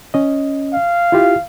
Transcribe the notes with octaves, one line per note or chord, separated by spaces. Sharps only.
C#4 D#5
F5
E4 F4 G4